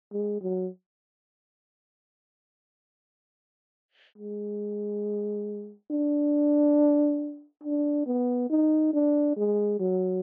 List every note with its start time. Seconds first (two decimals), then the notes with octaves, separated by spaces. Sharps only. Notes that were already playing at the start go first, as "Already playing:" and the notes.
0.13 G#3
0.42 F#3
4.18 G#3
5.91 D4
7.63 D4
8.06 B3
8.50 D#4
8.94 D4
9.37 G#3
9.80 F#3